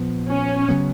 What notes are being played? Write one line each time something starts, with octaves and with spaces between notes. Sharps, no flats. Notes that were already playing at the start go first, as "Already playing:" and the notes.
Already playing: A#2 F3 B3
C#4
C#3 F#3 B3